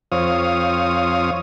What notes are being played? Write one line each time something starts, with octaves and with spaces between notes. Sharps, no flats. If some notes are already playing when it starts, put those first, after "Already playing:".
F2 F3 C4 C#5 F5 D#6